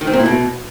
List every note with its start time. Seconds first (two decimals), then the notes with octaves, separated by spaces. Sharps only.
0.01 D#3
0.07 C4
0.13 A#2
0.20 E4
0.26 B2